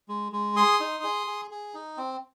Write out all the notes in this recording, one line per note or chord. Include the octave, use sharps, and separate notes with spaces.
G#3
G#3
G#4 C6 D#6
D#4
G#4
G#4
G#4
D#4
C4